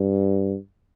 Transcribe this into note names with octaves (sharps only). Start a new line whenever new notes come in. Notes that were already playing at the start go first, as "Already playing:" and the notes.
Already playing: G2